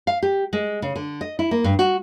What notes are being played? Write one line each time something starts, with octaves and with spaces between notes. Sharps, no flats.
F5
G4
G#3
C#3
D3
D#5
E4
A#3
G2
F#4